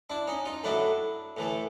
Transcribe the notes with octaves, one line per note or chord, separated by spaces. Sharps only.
D4 E4
C#4 D#4
D#4 F4
A2 F#3 A3 D4 E4
A2 E3 A3